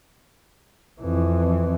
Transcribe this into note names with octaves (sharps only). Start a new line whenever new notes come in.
F2 E3